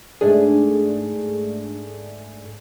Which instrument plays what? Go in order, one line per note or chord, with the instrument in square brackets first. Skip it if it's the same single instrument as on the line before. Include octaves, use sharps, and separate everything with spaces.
[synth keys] G#2 A3 D4 G#4